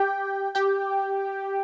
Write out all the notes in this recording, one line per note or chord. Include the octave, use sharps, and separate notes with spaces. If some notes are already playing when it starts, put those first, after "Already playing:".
Already playing: G4 G5
G4 G5